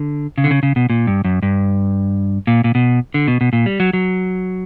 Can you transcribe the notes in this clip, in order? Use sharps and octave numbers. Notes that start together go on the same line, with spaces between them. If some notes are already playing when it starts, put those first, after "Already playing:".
Already playing: D3
C#3
D3
C#3
C#3
B2
A#2
G2
F#2
G2
A#2
A#2
B2
D3
B2
B2
A#2
G3
F#3
F#3